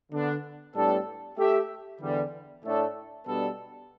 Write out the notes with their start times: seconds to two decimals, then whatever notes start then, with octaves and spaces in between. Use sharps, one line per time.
0.11 D3 B3 D4
0.74 A2 G3 B3 D4 A4
1.37 A3 G4 E5
2.00 E2 D3 G3
2.63 A2 A3 D4 A4
3.26 B2 G3 B3 D4 A4